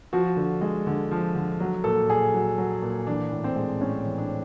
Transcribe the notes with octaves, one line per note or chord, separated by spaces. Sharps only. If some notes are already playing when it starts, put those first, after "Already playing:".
F3 F#4
D3
G#3
D3
F3
D3
F#3
A#2 A4
A#2 G#4
F#3
F#3
A#2
E3 D4
A2
C4
G#3
A2 C#4
E3
D4